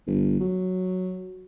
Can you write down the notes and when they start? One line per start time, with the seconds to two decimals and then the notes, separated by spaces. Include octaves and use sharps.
0.07 G1
0.40 F#3